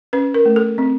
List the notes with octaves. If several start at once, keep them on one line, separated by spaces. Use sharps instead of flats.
C#4 B4
A#4
A3
A4
C4